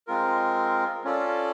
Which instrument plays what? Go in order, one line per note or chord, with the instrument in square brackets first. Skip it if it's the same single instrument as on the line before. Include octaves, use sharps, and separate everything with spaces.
[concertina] G#3 C4 F4 A#4
C#4 F4 A4 D5